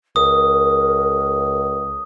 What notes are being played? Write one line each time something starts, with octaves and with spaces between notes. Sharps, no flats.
C#2 A#4 D#6